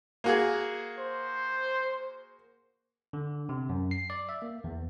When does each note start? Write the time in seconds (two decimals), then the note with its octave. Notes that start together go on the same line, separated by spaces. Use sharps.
0.24 A#3 F#4 G#4
0.98 C5
3.13 D3
3.49 C3
3.69 F#2
3.91 C7
4.10 D5
4.29 E5
4.42 A#3
4.64 E2